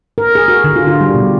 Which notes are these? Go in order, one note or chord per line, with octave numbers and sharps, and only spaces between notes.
A#4
G#4
F#4
D3
F4
F4
G3
B2